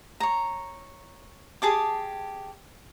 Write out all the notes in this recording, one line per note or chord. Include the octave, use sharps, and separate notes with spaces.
C#5 A#5
G4 G#4 A5 D6